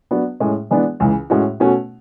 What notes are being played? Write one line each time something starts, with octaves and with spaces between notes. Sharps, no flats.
F#3 B3 D4 F#4
A2 G#3 C#4
E3 G#3 B3 D4
C#2 C#3 E3
A2 G#3 C#4 F#4
B2 A3 C#4 F#4